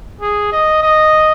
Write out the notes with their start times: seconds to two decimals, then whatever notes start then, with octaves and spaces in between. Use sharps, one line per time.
0.21 G#4
0.52 D#5
0.83 D#5